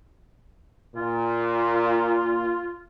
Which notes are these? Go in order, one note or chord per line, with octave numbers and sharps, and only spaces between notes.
A#2 F4